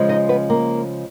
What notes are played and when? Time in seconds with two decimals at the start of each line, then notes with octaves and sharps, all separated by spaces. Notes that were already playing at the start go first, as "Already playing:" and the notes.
Already playing: C#3 F3 G#3
0.09 D#4 D#5
0.29 B3 B4
0.50 A#3 A#4